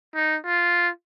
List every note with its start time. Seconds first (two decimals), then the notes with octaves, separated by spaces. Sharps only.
0.15 D#4
0.46 F4